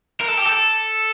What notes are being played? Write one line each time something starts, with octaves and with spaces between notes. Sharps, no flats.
A#4
A4
G4
A4